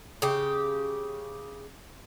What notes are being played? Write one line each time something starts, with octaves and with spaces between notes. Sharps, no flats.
C#3 G4